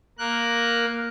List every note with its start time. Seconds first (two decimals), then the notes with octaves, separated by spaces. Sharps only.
0.19 A#3 A#4 F#6